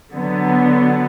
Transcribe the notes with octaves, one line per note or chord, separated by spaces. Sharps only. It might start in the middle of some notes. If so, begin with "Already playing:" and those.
D3 F#3 B3